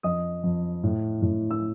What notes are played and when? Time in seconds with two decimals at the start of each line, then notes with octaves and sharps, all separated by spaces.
0.03 F2 D#5 D#6
0.44 F2
0.84 A2
1.22 A2
1.51 E6